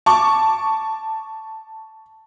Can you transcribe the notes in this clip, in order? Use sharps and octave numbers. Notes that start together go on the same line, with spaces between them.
A5 C#6 D6